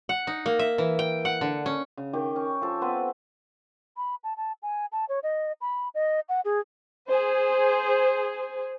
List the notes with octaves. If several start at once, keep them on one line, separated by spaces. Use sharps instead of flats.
F#5
D#4
A#3
E5
E3
G5
F#5
D3
C#4
C#3
D#3 G4
C#4
F3 A4
B3 C4 B4
B5
A5
A5
G#5
A5
C#5
D#5
B5
D#5
F#5
G#4
G#4 C5